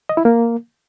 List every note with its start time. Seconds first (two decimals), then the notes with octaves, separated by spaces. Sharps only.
0.09 D#5
0.17 E4
0.25 A#3